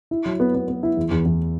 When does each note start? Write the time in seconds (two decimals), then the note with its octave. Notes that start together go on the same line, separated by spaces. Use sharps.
0.11 E4
0.25 F#3
0.40 B3
0.55 B3
0.68 B3
0.83 E4
0.97 E2
1.11 E2
1.25 E2